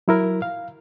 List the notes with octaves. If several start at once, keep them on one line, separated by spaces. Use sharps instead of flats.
F#3 E4 A#4
F5